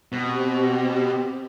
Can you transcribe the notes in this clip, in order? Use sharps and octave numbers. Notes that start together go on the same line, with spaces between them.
B2 C4 G4